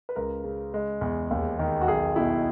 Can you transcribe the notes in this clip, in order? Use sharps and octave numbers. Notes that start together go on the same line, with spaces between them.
B4
C#2 A#4
C#3
G#3
E2
D#2
D#3
F#4
B1 G#4
B2 E4